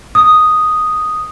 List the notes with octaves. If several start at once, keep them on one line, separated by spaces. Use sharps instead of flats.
D#6